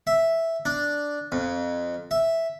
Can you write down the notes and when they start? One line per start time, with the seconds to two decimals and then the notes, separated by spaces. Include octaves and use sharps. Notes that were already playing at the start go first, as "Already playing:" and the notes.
0.07 E5
0.65 D4
1.32 F2
2.11 E5